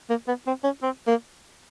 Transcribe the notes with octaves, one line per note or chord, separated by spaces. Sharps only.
A#3
B3
C4
C#4
C4
A#3